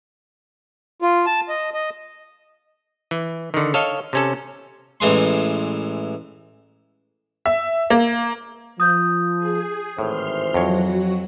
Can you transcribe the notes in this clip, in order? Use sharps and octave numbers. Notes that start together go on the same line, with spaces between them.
F4
A5
D#5
D#5
E3
D3 D#3
A4 C#5 D#5 F5
C3 C#4 A4
A1 E3 G#3 C6
E5
A#3
F3 D#6 G6
G#4
G#1 A2 E3 C5 C6 F6
F2 F#3 F#4 C#5